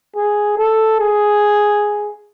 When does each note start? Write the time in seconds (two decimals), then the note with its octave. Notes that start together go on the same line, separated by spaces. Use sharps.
0.16 G#4
0.58 A4
1.00 G#4